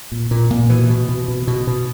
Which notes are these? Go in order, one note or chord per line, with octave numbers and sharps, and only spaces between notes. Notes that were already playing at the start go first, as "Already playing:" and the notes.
A#2
A#2
A#2
B2 E3
B2
B2
B2
B2
B2